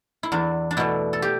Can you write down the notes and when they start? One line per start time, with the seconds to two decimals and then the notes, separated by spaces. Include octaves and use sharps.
0.23 E4
0.32 E2 D4
0.71 D4
0.77 B2 A3 E4
1.13 A4
1.22 G4